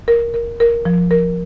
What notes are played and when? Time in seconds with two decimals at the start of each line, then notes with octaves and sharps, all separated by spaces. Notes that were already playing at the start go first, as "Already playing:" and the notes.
0.08 A#4
0.34 A#4
0.60 A#4
0.85 F3
1.11 A#4